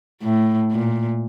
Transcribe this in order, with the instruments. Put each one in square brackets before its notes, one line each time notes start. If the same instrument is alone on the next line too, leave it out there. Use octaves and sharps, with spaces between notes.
[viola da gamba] A2
A#2